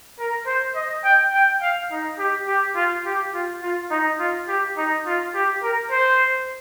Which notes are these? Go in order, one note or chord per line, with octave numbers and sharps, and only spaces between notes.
A#4
C5
D#5
G5
G5
F5
D#4
G4
G4
F4
G4
F4
F4
D#4
F4
G4
D#4
F4
G4
A#4
C5